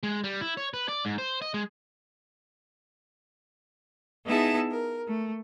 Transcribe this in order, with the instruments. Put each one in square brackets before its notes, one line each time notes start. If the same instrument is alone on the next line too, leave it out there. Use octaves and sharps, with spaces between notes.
[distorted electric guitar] G#3
G3
E4
C#5
B4
D5
G#2
C5
D#5
G#3
[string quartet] B3 D#4 E4 G#4 E5 A5
A#4
A3